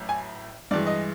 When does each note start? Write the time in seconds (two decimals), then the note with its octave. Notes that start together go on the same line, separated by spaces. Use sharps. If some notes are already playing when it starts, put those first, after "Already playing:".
Already playing: A1 A2 F#3
0.09 G#5
0.71 G2 E3 G#3 D5
0.87 D#5